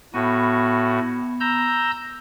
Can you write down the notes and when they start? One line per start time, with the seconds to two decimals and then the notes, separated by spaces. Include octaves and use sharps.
0.14 A2 B3 F#4 B5
1.40 A#5 E6 G6